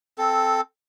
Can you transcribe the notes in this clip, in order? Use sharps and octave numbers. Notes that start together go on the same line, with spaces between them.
C4 A4